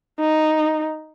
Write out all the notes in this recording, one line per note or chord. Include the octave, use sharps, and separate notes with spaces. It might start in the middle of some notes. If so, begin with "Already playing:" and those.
D#4